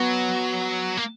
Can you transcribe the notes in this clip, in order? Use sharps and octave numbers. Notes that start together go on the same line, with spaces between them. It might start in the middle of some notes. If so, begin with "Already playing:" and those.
Already playing: F#3 B3
A#3